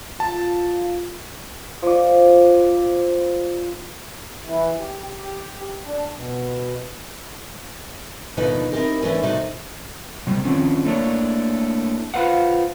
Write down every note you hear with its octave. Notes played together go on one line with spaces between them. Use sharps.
F4 A5
F3 D5
E3
G4
G4
D4
B2
D#2 B2 D3 F3 D#4 B4
C4 D#4 E4 G4 A#4
E3 A3 C#4 D4
C3 G3 A3 A#3 D#4 F#4
C3 G3 G#3
D3 D#3 F3 C4 C#4
A3 A#3 D4 E4 C#5
F4 B4 C5 F5 F#5